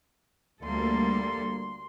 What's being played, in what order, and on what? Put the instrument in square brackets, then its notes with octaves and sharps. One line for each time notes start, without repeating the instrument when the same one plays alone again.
[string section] D2 [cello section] G3 A#3 A4 [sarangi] C6